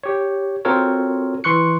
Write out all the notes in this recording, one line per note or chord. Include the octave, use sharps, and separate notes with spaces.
G4 C#5
C4 F4 F#4 A4 A#4 C#5
E3 C6 C#6 F#6 C#7